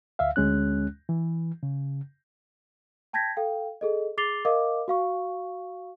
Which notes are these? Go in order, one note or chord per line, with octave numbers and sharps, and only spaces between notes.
D2 E5 F5
D2 G#3 C#4 F#6
E3
C#3
G5 A5 G6 G#6 A#6 B6
A4 F5 G5
G#4 A4 D#5
G#4 D6 A6 C7 F7 G7
A#4 D#5 F5 D6
F#4 F5 C#6